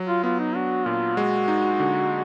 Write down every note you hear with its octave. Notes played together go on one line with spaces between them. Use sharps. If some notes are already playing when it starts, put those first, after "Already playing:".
Already playing: F#3
F4
B3 F4
D#4
D4 F#4
A#2 F4
G#3 F#4
D#4
D3